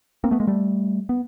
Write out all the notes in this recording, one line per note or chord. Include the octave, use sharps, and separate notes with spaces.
A#3 C4
A3 B3
G#3 A#3
G3 A3
B3